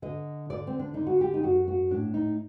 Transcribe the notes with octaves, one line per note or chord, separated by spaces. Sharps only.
D3 D#5
D3 D5
C4
D4
D3 D#4
F#4
G4
D#4
F#2 F#4
F#4
A2 D4
D#4